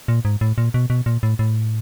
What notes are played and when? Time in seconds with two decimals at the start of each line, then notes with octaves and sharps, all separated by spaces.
0.08 A#2
0.25 G#2
0.41 A2
0.58 A#2
0.74 B2
0.90 B2
1.06 A#2
1.23 A2
1.39 A2